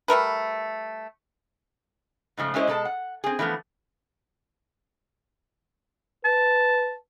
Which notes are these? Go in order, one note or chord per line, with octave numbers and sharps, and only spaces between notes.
G3 A3 A#4 B4
G#2 C#3 F3 A3
G#3 C#4 E4 G#4 C5 D#5
B2 G#3 A4 A#4 A5
F#5
C4 G#4
E3 F3 A3 B3
B4 A5